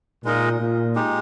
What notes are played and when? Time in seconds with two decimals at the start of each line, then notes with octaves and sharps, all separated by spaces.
0.25 A#2 G#3 D#4 A#4 D#5
0.60 A#2
0.95 G#3 D#4 G4